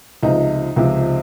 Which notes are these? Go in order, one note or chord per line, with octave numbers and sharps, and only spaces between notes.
C#2 C3 F3 D#4
C#2 C3 F3